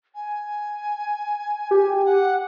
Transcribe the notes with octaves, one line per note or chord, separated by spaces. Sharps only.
G#5
G4
F#5